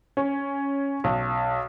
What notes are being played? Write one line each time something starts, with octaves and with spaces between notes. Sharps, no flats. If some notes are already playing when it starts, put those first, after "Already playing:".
C#4
B1